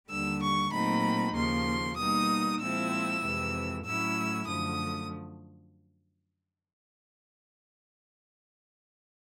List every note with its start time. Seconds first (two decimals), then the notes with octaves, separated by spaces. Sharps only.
0.10 D#2 D3 G3 E6
0.41 C#6
0.73 A#2 F#3 A3 C4 D#4 B5
1.35 D#2 C#3 F3 A#3 C6
1.98 B2 G3 A#3 D#4 D#6
2.60 A#2 F3 G#3 C4 E4 E6
3.23 F2 C3 E3 G#3
3.85 A2 F#3 A3 C#4 E4 E6
4.48 F#2 D3 F3 A3 D#6